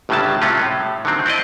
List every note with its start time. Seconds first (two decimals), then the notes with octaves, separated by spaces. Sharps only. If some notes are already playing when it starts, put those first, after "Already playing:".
0.09 G1 A2 C#3 F#3 G3 A5
0.41 C3 F#3 A3 C#4 F4
0.62 A2
1.05 D3 D#3 F#3 C4
1.26 C4 E4 D5 D#5